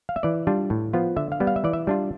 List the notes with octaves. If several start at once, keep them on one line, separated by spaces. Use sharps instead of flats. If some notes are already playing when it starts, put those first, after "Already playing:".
F5
E5
E3 D5
G3 D4 F4
A2
F3 B3 F4
D3 E5
F5
G3 B3
F5
E5
E3 D5
E5
G3 D4 F4